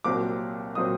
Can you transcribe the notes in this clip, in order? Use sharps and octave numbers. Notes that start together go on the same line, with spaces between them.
C2 A#2 F#3 C4 D6
A#2 F#3 C4 D#6